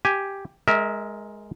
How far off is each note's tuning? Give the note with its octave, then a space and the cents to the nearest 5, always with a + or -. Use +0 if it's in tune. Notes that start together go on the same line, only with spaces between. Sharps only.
G4 +0 G#5 +0
G#3 +0 A#4 +5 E5 -30